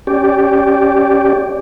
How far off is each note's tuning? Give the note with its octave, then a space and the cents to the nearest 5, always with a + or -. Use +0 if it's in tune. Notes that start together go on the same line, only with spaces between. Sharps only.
C#4 +0 G4 +0 D5 +0